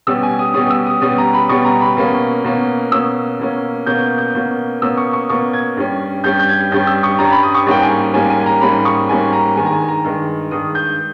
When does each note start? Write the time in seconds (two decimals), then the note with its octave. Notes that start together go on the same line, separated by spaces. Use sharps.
0.07 B2 G3 C#4 E6
0.23 G#5
0.39 D#6
0.54 B2 G3 C#4 D#6
0.70 E6
0.86 D#6
1.02 B2 G3 C#4 D#6
1.18 A#5
1.33 B5
1.49 B2 G3 C#4 C#6
1.65 A#5
1.81 B5
1.97 B2 A#3 C#4
2.44 B2 A#3 C#4
2.92 B2 A#3 C#4 E6
3.40 B2 A#3 C#4
3.86 B2 A#3 C#4 G6
4.18 G6
4.35 B2 A#3 C#4
4.82 B2 A#3 C#4 E6
4.97 C#6
5.13 C#6
5.30 B2 A#3 C#4 C#6
5.53 G#6
5.77 G2 G3 C#4
6.24 G2 G3 C#4 G6
6.39 G6
6.48 G#6
6.72 G2 G3 C#4 G6
6.87 E6
7.03 C#6
7.19 G2 G3 C#4 A#5
7.31 B5
7.43 D#6
7.54 C#6
7.66 G#2 G3 A#3 C#4 G5
7.83 G#5
8.14 G#2 G3 A#3 C#4 G#5
8.30 G#5
8.41 G#5
8.46 A#5
8.61 G#2 G3 A#3 C#4 B5
8.85 C#6
9.09 G#2 G3 A#3 C#4 G#5
9.33 A#5
9.56 G2 D#3 G#3 G#5
9.66 A#5
9.72 G#5
9.88 A#5
10.04 G2 D#3 G#3
10.51 G2 D#3 G#3 D#6
10.75 G6